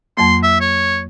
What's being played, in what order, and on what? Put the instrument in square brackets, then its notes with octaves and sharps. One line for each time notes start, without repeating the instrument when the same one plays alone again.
[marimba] F2 F#3 A#3 [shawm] C6
[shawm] E5
C#5